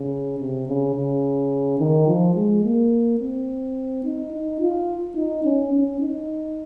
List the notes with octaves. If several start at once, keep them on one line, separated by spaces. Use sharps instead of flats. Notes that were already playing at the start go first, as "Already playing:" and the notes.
Already playing: C#3
C3
C#3
C#3
D#3
F3
G#3
A#3
C4
D#4
D#4
F4
D#4
C#4
C#4
D#4